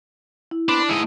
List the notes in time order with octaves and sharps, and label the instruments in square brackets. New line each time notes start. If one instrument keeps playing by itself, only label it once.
[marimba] E4
[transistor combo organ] B3 C4 B4 [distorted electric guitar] D4
[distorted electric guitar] A2 D#5 [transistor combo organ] G#3 D#4 E4